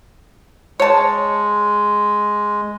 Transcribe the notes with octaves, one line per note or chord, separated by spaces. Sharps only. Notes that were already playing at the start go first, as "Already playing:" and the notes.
G#3 C#5 A5